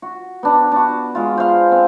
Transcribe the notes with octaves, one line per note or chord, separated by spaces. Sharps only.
F#4
B3 D4
D4 F#4
G#3 F4
C5 F5
C4